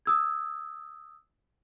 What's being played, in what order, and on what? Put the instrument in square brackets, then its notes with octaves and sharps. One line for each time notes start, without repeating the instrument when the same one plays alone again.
[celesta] D#6 E6 G#6